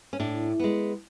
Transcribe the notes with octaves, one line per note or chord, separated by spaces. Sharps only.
C#4
A2 D4
G#3 B3